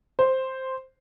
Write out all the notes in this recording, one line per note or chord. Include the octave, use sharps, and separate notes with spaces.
C5